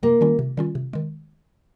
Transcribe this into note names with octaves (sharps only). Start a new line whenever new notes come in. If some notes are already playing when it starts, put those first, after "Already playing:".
C3 A#3
D#3 G3 C#4 F4
C3
D#3 G3 C#4 F4
C3
D#3 G#3